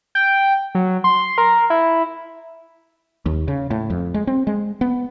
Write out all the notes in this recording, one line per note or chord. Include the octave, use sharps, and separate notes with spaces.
G5
F#3
C6
A#4
E4
D#2
C#3
A2
F2
G#3
C4
G#3
B3